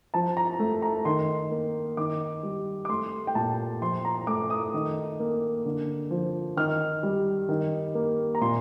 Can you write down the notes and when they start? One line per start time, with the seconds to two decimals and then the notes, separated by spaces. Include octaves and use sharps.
0.14 F3 A5
0.37 A#5
0.59 A3
0.82 A#5
1.05 D#3 C6
1.51 A#3
1.97 D#3 D6
2.43 G3
2.85 D6
2.89 A3 C6
3.27 G5
3.35 A#2 A5
3.81 F3 C6
4.05 A#5
4.27 A3 D6
4.50 D#6
4.74 D#3
5.20 A#3
5.66 D3
6.11 F3
6.57 D#3 F6
7.03 G3
7.49 D#3
7.95 A#3
8.35 A#5
8.41 A#2 C6